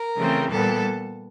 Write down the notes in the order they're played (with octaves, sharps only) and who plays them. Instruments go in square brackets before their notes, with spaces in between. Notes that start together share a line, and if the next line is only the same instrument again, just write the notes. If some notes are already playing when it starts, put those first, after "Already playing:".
Already playing: [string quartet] A#4
C#3 E3 A3 C4
A#2 G3 B3 A4